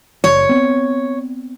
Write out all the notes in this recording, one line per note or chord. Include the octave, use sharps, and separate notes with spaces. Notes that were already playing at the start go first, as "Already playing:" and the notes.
F#1 C#5
B3 C4